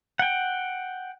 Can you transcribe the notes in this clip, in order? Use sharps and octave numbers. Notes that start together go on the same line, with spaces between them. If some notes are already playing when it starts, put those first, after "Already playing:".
F#5 G5